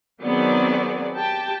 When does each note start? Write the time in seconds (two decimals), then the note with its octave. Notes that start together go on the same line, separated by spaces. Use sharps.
0.21 D#3 F#3 B3 C4 G#4 D5
1.17 G4 G5 A5